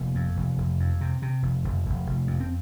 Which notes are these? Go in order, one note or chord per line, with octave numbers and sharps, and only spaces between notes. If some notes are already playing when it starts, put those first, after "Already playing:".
Already playing: F1 A#3
F2
F1
F1
F2
C3
C3
F1
F1
F1
F1
F2
C4